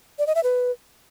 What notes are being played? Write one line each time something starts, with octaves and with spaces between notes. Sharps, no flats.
D5
D#5
E5
B4